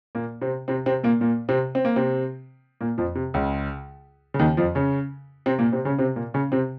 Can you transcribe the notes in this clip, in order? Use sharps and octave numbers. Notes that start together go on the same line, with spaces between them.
A#2 A#3
C3 C4
C3 C4
C3 C4
A#2 A#3
A#2 A#3
C3 C4
C4
A#3
C3 C4
A#2 A#3
F2 F3
C3
C#2 C#3
C#3
D#2 D#3
F2 F3
C#3 C#4
C3 C4
A#2 A#3
C3 C4
C#3 C#4
C3 C4
A#2 A#3
C#3 C#4
C3 C4